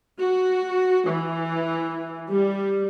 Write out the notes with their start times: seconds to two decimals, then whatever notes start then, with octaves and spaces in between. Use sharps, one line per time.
0.20 F#4
1.08 E3
2.29 G3